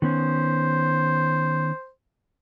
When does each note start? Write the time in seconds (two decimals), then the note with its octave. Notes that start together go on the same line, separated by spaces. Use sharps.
0.02 D#3 B3 C#4 C5